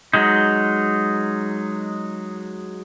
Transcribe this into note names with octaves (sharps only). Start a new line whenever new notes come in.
F#3 G#3 D#4